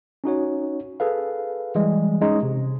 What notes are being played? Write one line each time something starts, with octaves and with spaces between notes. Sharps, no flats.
C#4 D#4 F#4 C#5
G#4 A4 B4 F5
E3 G3 G#3
G#3 C#4 D#4
C3